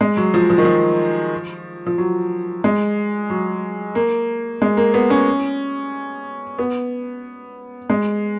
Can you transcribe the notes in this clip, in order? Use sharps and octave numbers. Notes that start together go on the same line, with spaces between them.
G#3
F#3
F3
F3
D#3
F3
F3
F#3
G#3
F#3
A#3
G#3
A#3
B3
C#4
B3
G#3